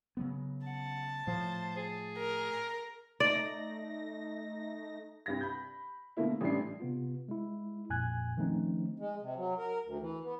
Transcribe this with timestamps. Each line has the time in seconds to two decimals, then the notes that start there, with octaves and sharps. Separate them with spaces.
0.17 C#3 F#3 B3
0.66 F#5 A5
1.27 A2 F3 C5
1.76 G#4
2.18 A#4
3.20 A3 D#4 D5 A#6
5.26 C2 G2 A#6
5.41 B5 G6
6.17 B2 D3 A3 A#3 E4
6.41 A1 A2 G3 D4 C7
6.80 C3 B3 F4
7.29 G#3 E4
7.89 A1 F2 A#2 G#5 F#6 G#6
8.37 D#3 F3 A3 C4 C#4 D#4
8.99 G#3
9.22 C3
9.37 F#3
9.58 A#4
9.85 D2
10.00 E3
10.24 B3